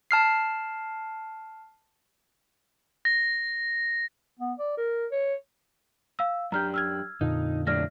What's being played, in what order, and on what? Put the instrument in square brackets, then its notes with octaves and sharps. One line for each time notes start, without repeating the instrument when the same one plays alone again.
[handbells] A5 F6 C7
[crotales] A#6
[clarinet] B3
D5
A#4
C#5
[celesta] F5 E6
[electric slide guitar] F#2 D4 G4 [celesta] A#5 F6 G6
[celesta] E6 F6 G#6
[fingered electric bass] F2 A#2 D3 [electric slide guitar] D#4
[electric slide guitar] A2 F#3 D4 [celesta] D5 F6 A#6